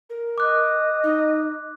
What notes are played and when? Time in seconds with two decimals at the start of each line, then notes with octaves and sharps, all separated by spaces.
0.10 A#4
0.38 D#5 D6 F#6
1.03 D#4